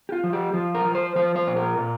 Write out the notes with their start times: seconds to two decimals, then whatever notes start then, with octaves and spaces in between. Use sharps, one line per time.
0.09 G4
0.12 F4
0.24 F3
0.33 G4
0.54 F3 F4
0.75 A#4
0.85 F3
0.95 C5
1.16 F3 C5
1.36 C5
1.47 A#2
1.56 A#4
1.77 A#2